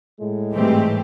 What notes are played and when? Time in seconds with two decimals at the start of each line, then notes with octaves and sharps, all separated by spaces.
0.20 A2 G#3
0.54 G#2 E3 G3 A3 C4 G4